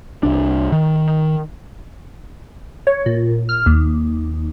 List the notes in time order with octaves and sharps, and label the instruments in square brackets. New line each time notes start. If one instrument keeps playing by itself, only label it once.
[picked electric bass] C2 D4
D#3
[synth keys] C#5
A#2
F6
D#2